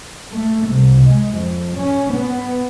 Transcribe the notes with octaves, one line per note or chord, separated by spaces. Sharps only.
A3
C2
G#3
F2
C#4
B3